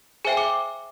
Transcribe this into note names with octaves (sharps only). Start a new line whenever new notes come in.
G#4 C5 E5 G5 G#5
D6